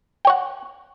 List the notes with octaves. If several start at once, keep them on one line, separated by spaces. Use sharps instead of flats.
C#5 F#5 G5